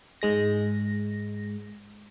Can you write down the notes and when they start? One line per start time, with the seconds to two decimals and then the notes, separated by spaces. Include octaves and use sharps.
0.22 G#2 G#3 A#6